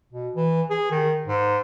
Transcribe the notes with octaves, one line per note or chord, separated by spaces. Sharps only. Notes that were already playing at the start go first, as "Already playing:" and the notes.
B2
E3
G#4
D#3
G#2